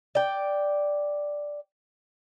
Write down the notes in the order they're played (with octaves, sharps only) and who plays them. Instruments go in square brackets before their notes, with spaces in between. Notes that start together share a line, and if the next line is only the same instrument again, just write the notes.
[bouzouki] D5 G5